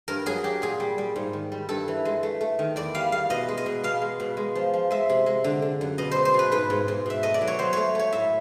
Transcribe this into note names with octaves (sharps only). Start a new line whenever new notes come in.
G2 A#4
F#3 G#4
F#3 G4
A#2 G#4
G3
G3
G#2
D#3
G3
G2 A4
E3
G#3
A3
A3
D#3
E2 D5
G3 F5
E2 F5
B2 D#5
G#3
D#5
B2
B2 F5
G#3
B2
G#3
F3
F3
G#3 E5
C3
G#3
D3
D3
F#2
B2 D#5
G#3 C5
C5
B2 B4
G#2 B4
G#2
G#2
B2 E5
A3 D#5
D5
F#3
C#5
F#3 C5
A3 C#5
A3 C#5
A2 E5